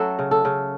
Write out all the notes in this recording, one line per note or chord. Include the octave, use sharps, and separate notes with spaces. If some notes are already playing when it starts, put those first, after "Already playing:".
Already playing: F#3 A3 C#4 F#4 A4
C#3
A4
C#3